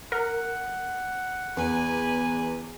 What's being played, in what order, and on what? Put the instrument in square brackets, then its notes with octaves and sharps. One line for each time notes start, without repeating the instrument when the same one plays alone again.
[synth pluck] A#4 [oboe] F#5
[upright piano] E2 [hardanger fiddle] B4 G#5